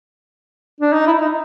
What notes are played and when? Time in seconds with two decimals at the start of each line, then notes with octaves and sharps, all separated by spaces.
0.81 D4
0.93 D#4
1.07 E4
1.21 D#4